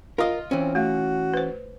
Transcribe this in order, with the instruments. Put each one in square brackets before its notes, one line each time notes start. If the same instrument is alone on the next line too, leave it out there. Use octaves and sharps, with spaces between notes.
[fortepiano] F4 D#5 [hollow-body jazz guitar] A#4 F5
[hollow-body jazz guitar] E3 C#4 [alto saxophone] C4
[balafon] A3 F5 [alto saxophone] F#4
[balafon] B4 C5